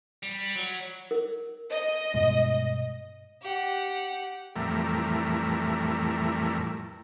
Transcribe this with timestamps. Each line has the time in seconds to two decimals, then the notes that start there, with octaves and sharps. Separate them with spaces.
0.23 G3
0.56 F#3
1.11 A#4
1.71 D#5
2.14 G2 B2 G#3
3.42 G4 F#5
4.56 F2 A2 E3 G3 A3 A#4